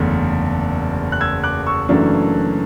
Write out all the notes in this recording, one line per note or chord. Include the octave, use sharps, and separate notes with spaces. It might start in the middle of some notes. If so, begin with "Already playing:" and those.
Already playing: F#1 E2 D3 A3
F#6
E6 G#6
D6 F#6
C#6 E6
F#1 F#2 E3 A3 D4